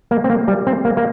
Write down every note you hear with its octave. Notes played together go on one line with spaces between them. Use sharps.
A#3
C4
A#3
G3
C4
A#3
A#3